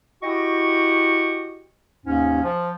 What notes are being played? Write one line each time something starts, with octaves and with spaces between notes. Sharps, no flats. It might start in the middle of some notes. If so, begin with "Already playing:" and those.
E4 F#4 G4 D#5 G5 C#6
D#2 G#2 C3 C#4
F3